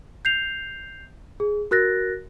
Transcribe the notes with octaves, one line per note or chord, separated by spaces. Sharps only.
G6 C7 F7
G#4
F#4 A#4 F#6 A6 A#6